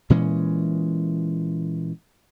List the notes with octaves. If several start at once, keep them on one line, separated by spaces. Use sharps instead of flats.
A#2 E3 G#3 C#4